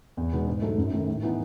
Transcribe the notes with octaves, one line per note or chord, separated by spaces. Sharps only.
E2
B2 G#3 B3 D#4
G#2
F#3 A3 D#4
F#2
D#3 A3 D#4
A2
E3 B3 D#4